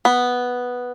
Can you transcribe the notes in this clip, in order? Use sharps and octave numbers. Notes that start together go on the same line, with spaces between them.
B3